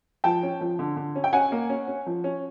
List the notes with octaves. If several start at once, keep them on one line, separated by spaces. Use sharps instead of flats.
F3 G5 A5
C#4
F3
D3
D3
C#4
G5
C#4 F#5 G#5
A#3
C#4
C#4
F3
C#4